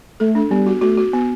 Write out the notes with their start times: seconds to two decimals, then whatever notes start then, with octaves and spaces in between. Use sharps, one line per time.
0.20 A3 A4
0.35 D4
0.50 G3 B3
0.67 F#4
0.81 A3 F#4
0.98 F#4
1.13 B3